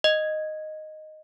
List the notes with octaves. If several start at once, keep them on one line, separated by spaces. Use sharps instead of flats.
D#5